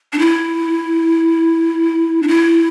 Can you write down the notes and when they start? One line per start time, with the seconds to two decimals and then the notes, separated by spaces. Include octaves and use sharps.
0.13 D4
0.19 E4
2.23 D4
2.28 E4